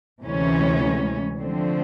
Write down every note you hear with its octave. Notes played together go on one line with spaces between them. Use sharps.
D2 C3 E3 G#3 C#4
D3 F3 A3 C4